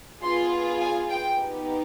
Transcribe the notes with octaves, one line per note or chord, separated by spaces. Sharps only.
B3 F4 G#4 C6
G#5
G5
B3 D#4 G4